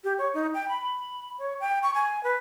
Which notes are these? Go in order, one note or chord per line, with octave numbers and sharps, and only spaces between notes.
G4
C#5
D#4
G5
B5
C#5
G5
C#6
G#5
B4